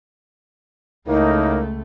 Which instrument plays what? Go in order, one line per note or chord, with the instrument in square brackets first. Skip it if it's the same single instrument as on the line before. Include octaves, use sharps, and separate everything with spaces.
[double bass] C#2 A3 [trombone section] A2 A#3 A#4 [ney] D#4